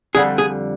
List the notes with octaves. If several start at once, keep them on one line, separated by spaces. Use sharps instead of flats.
F2 D3 G3 G#4
G#4